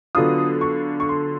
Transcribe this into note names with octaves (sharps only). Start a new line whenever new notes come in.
D3 F#3 B3 D4 F4 D#6
C#6
C#6
C6